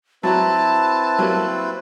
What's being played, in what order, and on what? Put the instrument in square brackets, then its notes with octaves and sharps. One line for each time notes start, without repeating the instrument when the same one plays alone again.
[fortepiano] F#3 F#4 A#5 [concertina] C4 E4 B4 [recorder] A5
[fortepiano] F#3 G3 A#3